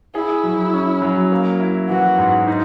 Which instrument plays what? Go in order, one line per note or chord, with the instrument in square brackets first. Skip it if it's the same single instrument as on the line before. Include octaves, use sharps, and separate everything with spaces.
[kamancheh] E4 [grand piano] G#4
[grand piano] F#3
C#4
F#3
A#3
E4
[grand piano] E3 [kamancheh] F#4
[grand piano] G#2
D#4